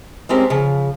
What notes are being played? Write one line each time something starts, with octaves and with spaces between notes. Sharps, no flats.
G#3 A3 C4 C#4 G4 A#4
C#3 F3